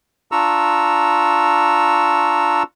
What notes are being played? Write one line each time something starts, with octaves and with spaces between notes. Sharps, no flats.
D4 F4 A#5 C#6 E6